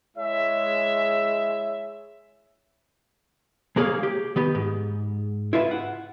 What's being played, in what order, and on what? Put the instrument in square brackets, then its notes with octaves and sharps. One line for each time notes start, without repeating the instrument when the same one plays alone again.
[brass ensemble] G#3 E4 G#4 C#5 E5
[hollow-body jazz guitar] G#3 A#3 G#4 B4 C#5 F5
G4
D#3 B3 G4
G#2
E4 F4 B4 E5
F#5